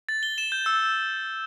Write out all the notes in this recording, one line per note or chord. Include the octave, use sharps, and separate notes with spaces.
A6
G7
E7
G6
E6